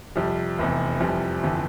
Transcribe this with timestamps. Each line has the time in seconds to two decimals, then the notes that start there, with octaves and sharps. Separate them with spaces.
0.16 F2 C3 G3
0.58 F1 E2 C3
1.00 F2 C3 E3 G3
1.43 G1 F2 E3 B3